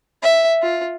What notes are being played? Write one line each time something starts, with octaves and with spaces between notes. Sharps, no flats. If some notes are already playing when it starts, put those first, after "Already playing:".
E5
F4